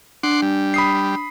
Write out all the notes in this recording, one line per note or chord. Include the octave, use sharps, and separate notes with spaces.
D4 F#5 C6 D6
G3
B5 D#6 C7